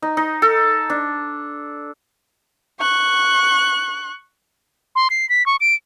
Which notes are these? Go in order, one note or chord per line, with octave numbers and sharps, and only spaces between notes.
D#4
D#4
A4
D4
C#6 F#6
C6
C7
B6
C#6
D7